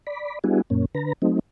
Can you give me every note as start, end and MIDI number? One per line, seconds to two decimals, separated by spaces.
0.07 0.39 74
0.07 0.39 83
0.44 0.62 55
0.44 0.62 59
0.44 0.62 62
0.44 0.62 64
0.44 0.62 66
0.44 0.62 68
0.70 0.85 42
0.70 0.85 46
0.70 0.85 58
0.70 0.85 61
0.95 1.13 50
0.95 1.13 71
0.95 1.13 82
1.22 1.39 54
1.22 1.39 57
1.22 1.39 60
1.22 1.39 63